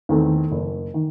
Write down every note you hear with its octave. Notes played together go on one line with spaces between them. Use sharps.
E2 D#3 A3 C4
F#1
D#3